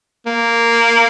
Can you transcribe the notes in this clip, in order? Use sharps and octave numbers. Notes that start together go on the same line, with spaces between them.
A#3